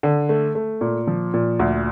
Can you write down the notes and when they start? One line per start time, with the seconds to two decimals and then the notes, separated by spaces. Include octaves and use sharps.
0.03 D3
0.29 A3
0.55 A3
0.81 A#2
1.07 F3
1.34 A#2
1.60 D2